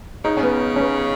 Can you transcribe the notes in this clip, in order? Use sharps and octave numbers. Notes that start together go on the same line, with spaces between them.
C#3 D#4
C#4
B3
C#4
B3